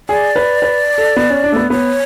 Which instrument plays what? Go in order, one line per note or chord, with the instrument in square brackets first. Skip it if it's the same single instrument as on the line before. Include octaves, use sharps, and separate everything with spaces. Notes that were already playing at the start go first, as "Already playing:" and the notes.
[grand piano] G#4 [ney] D5
[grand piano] B4
B4
A4
B3
C#4
D4
A3
B3
[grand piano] B3 [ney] C#5